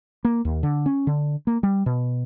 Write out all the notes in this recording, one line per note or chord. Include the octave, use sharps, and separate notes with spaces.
A#3
D#2
D3
C#4
D3
A#3
G3
B2